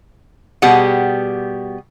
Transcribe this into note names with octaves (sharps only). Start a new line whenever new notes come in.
B2 G3 B3 G4 G#4 F#5